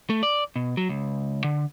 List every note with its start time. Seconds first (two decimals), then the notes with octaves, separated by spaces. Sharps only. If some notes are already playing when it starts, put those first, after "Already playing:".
0.10 A3
0.23 D5
0.56 B2
0.77 F#3
0.89 C#2
1.44 D3